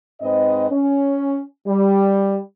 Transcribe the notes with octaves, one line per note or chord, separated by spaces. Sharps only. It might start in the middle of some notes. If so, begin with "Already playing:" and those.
G#2 C4 B4 D#5
C#4
G3